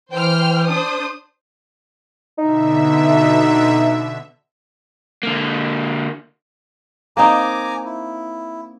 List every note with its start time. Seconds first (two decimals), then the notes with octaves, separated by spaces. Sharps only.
0.12 E3 C5 G5 F6
0.67 D4 C5 D#6
2.38 B2 D3 D#4 E5
5.23 D3 A#3
7.17 A#3 C4 D#4 G#5 A#5 D6
7.85 E4